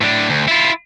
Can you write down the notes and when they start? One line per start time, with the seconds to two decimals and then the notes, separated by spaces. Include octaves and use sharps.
0.01 A2 D4
0.30 D2
0.48 E4 F4